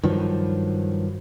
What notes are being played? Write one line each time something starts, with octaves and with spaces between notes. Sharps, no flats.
G2 D#3 F3 F#3